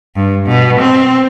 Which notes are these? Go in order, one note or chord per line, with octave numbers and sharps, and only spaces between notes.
G2
B2
C4